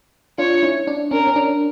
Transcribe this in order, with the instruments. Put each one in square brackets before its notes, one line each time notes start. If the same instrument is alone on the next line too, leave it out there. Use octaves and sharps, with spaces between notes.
[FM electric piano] D4 F4 [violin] C#5
[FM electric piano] C#4 E4
D4
[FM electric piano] C#4 [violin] A#4
[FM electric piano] C#4
D4